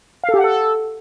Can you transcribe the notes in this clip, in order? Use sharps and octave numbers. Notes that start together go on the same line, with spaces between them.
F5
A4
G4
F#5
A4